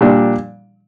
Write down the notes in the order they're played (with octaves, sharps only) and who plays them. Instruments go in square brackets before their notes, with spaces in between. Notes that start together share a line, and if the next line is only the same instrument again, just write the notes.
[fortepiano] A#2 G3 D4